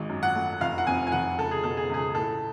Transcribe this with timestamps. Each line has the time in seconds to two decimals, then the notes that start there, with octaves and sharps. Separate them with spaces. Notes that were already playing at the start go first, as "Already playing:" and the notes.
Already playing: G#1 G#3
0.09 F#2
0.23 F#5
0.35 A3
0.61 F1 F5
0.78 F#5
0.87 F2 G#5
1.07 G#5
1.12 F1 F#5
1.39 C#2 A4
1.51 G#4
1.64 B2 A4
1.77 G#4
1.90 C#2 G#4
2.15 A2 A4